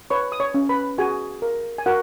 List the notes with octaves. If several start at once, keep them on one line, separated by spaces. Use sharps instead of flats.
B4 C#5 C#6
D#6
C#5 C#6
C#4
B4 B5
F#4 G#4 G#5
A#4
G#5
F#4 A#4 F#5